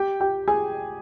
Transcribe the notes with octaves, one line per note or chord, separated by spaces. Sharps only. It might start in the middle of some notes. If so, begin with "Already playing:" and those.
Already playing: G4 G5
G4 G5
G#4 G#5